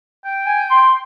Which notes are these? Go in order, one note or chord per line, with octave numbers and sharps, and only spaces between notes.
G5
G#5
C6